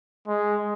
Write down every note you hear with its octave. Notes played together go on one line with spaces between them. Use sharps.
G#3